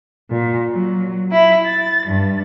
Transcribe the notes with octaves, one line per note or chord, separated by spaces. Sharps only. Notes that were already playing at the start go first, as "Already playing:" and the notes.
A#2
F#3
E4
A6
G2